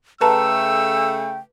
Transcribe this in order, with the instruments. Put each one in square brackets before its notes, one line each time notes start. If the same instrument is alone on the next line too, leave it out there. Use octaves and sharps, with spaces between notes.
[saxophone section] C#3 A3 [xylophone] B4 A5 A#5 [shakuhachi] G5 [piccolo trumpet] E6